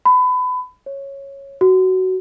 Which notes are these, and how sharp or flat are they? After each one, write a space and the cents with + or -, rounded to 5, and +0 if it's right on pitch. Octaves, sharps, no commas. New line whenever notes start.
B5 +25
C#5 -10
F#4 +15